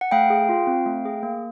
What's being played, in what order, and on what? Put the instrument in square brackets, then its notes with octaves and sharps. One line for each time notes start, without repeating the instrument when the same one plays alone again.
[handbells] F#5
A3 F5 G5
G#4
F4
C4
A3
G#4
A#3